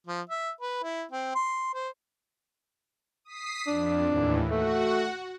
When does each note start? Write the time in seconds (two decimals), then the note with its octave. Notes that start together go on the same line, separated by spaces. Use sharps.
0.07 F3
0.30 E5
0.61 B4
0.83 E4
1.12 C4
1.35 C6
1.74 C5
3.25 D#6 B6 C7
3.67 F2 D4
4.07 D#2 A2 E3
4.51 A3 F#4 F#5